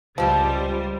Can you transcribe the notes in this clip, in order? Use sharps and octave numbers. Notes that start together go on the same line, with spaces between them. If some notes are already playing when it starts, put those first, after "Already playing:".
C#2 F3 G3 C4 C5